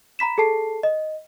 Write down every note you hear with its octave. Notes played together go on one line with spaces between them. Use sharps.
A#5 B5 B6 E7
G#4 A4 A5 C7
D#5